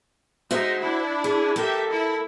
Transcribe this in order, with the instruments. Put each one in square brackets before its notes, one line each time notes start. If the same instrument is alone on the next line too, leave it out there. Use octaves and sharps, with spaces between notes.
[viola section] G#3 D#4 [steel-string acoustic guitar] F#4 C5 E5
[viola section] D4 E4
[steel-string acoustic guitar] G#4
[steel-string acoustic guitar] A#3 A4 [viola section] G4 E5
[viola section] E4